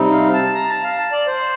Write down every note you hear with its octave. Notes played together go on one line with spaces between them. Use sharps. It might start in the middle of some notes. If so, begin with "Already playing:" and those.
Already playing: C3 G3 C4 D#4
F5
A5
A#5
A5
F5
A5
D5
C5